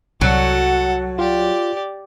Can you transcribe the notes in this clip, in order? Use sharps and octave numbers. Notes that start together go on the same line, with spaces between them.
C2 F#3 A4 F#5
F4 G4 D5